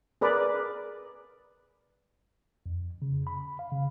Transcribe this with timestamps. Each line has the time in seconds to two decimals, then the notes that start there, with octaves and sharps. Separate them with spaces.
0.21 G#4 A#4 B4 D5
2.66 F2
3.02 C#3
3.27 B5
3.59 F5
3.72 C#3